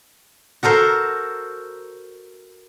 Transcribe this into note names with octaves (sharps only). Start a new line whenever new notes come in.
F#4 A4 A#4 C5